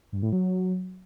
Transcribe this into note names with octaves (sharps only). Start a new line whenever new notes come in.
G2
A2
F#3